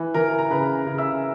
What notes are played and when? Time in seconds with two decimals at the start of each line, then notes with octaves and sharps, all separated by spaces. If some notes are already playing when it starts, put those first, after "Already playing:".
Already playing: E3 B4
0.14 E3 A#4 A#5
0.39 A#5
0.50 C#3 B4 B5
0.86 C#3
0.98 E5 E6